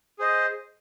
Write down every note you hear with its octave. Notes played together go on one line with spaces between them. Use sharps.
G#4 C5 D#5